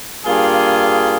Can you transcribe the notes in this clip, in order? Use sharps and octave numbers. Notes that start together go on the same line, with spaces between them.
G2 G3 A#3 F4 G#4